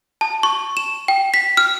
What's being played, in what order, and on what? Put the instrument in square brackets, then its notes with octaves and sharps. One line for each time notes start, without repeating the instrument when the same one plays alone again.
[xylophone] A5
C#6
E7
G5
B6
F6